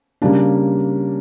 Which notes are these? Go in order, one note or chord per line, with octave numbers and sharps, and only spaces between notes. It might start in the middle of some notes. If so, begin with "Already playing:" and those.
C#3 G3 A#3 D4